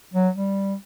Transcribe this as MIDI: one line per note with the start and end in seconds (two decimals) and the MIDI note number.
0.13 0.29 54
0.35 0.74 55